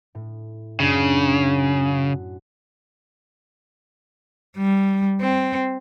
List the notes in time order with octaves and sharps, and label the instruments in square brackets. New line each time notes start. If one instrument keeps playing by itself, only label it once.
[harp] A2
[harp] F#2 C#4 D4 [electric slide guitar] C#3
[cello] G3
C4